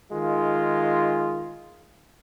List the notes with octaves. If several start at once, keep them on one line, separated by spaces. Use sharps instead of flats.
D#3 G#3 F4